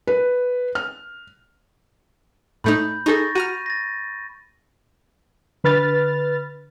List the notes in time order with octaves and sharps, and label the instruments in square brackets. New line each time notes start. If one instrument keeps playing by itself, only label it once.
[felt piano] B4
F6
[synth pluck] A2 A3 D#4 [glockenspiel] B5 G6
[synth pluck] D#4 G#4 A4 [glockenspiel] C#6 A6 A#6
[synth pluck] F#4 A#5 F6 [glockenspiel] D#7
[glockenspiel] A6 A#6
[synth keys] D3 B4 F6 A6